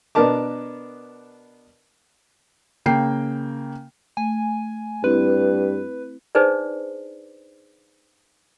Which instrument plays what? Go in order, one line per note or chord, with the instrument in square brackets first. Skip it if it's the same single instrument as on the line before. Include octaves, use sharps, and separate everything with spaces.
[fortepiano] B2 B3 D4 A#4 A5 D6
[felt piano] C#3 A#3 G5 C7
[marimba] A3 [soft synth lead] G#5
[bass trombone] G2 [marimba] C4 E4 [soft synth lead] B4
[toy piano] D4 D#4 G#4 B4 C5 D5